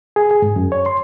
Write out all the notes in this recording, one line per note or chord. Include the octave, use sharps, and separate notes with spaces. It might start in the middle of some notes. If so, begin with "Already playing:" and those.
G#4
G#4
G#2
F#2
C#5
C6